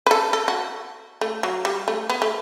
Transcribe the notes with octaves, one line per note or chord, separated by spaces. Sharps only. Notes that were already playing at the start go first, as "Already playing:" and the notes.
B4
A4
A4
F#4
A3
F#3
G3
A3
B3
A3